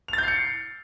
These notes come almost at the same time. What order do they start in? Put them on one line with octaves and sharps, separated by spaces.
F7 A6 G6 C7 C#7